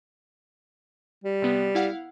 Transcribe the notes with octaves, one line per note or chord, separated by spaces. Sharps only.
G3
C3 B3
E4 F5 F#5